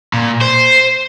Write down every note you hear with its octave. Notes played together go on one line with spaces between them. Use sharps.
A#2
C5